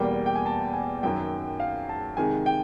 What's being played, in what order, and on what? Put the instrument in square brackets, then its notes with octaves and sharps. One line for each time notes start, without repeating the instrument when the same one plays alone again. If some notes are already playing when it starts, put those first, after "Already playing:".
Already playing: [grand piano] E2 B2 G3 A#3 G5
G5
G#5
A5
G#5
F#2 D#3 F#3 G5
F5
A5
C3 D#3 G#3 G#5
G5